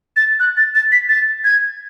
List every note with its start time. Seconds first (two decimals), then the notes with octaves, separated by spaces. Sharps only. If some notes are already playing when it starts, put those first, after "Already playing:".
0.16 A6
0.40 F#6
0.57 A6
0.75 A6
0.92 B6
1.09 A6
1.44 G#6